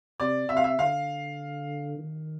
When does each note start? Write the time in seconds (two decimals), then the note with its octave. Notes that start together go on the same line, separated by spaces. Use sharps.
0.20 C3 D5
0.49 C3 E5
0.57 F5
0.64 E5
0.79 D3 F5
1.98 D#3